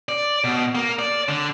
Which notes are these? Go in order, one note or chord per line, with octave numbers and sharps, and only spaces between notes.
D5
B2
A#3
D5
D3